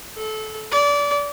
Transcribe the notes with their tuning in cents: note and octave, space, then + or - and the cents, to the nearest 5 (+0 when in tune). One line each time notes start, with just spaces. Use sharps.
A4 -25
D5 -25